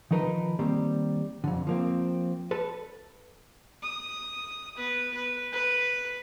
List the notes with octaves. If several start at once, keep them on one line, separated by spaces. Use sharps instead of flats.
D#3 F3 D#4 A#4 B4
D#3 G3 A#3 C4
F2 D3
F3 A#3 C4
A4 B4
D#6
B3 B4
B4
B4